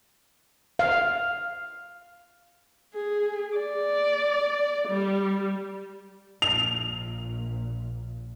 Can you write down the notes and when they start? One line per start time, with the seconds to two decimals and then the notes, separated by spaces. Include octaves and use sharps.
0.79 F5
2.94 G#4
3.57 D5
4.88 G3
6.42 A#1 A#2 F7